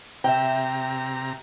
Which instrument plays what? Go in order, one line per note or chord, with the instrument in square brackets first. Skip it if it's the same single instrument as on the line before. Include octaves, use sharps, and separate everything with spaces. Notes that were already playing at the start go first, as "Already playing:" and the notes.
[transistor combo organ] C3 A#5 [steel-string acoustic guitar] E5 G5